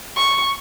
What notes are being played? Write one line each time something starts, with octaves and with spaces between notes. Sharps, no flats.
C#6